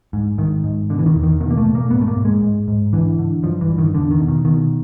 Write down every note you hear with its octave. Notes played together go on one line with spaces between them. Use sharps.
G#2
G#2 D#3
G#2
B2 D3
E3
D#3
E2
D#3
B2 D#3
A#3
A3
B2
A#3
G#2 B3
A3
A#3
G#2
G#3
G#2
G#2
D3 E3
D3
G2 F3
E3
G2
D#3
E2 D3
D#3
B2
D#3
B2 D#3